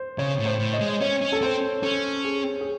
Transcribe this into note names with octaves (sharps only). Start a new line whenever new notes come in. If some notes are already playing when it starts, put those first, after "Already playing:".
Already playing: C5
C#3 C#5
A2
C5
A2
D#5
G#3
D#5
C#4 C#5
C#4
A4
C4 C5
C#4 A4
G#4
G#4